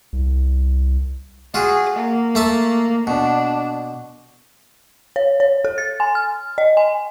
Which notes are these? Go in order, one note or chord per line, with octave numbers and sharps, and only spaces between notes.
C2
F4 F#4 G#4
A#3
A3 E5 A5
B2 D4
C#5
C#5
A4
A6
G#5
F6
D#5
G#5